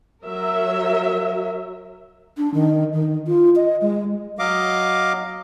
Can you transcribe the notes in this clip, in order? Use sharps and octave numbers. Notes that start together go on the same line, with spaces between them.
F#3 A#4 E5
D4
D#3
D#3
F4
D#5
G#3
F#3 D#5 F5 D6